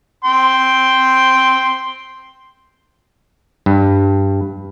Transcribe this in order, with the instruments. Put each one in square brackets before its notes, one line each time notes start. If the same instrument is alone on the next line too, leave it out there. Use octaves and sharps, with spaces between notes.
[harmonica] G5 C6
[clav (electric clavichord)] G2